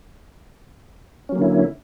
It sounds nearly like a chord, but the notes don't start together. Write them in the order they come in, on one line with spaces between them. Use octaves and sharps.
C#4 F#3 A#3 D3 E4